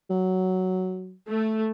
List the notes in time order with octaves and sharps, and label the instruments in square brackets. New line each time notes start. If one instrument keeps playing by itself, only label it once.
[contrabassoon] F#3
[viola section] A3